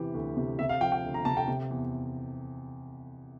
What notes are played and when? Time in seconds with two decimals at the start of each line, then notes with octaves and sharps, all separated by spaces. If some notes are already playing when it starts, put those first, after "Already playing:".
Already playing: E2 C3 E3 G4
0.14 D2
0.37 C3
0.59 C3 E5
0.69 F5
0.81 F3 G5
0.92 G5
1.04 D2
1.14 A#5
1.25 C3 A5
1.37 G5
1.48 C3
1.71 E2